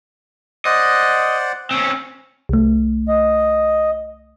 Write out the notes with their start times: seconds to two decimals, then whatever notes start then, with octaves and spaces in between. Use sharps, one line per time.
0.65 C5 D5 D#5 F#5
1.71 C4 C#4
2.49 C2 A3
3.08 D#5